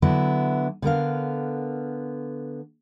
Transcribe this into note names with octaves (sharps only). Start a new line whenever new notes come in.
D3 F#3 B3 D4 E4
D3 B3 A#4 F5